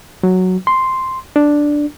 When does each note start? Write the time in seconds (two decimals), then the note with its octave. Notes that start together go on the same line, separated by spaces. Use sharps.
0.23 F#3
0.67 C6
1.36 D4